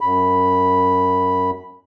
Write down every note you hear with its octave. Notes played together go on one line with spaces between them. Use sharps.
F#2 B5